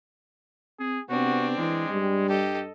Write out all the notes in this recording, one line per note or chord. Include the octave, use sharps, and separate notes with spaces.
C4 G#4
C3 B3 C4 D4 F#4
E3 G#3
G2 G3
G4 A4 D#5